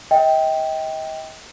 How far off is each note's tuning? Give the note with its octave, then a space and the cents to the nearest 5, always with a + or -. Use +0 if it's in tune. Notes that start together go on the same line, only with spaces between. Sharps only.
D#5 +40 G5 +0